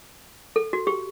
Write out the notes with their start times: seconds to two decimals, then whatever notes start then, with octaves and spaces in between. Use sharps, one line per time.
0.56 A4
0.73 F#4
0.87 G4